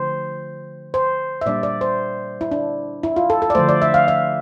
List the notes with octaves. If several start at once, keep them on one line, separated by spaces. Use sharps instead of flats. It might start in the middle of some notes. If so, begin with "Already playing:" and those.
Already playing: D3 F3 A3 C5
C5
E5
A#2 G3 D4 D5
D5
C5
E4
D4
E4
F4
A4
A4
D5
D3 F3 A3 C5
D5
E5
F5
E5